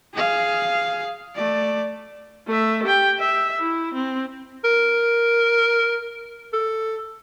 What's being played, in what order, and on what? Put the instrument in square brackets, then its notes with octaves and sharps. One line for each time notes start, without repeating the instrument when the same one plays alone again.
[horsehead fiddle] G#4 F5
A3 D5
[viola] A3 E5
G4 G5
E5
E4
C4
[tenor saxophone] A#4
A4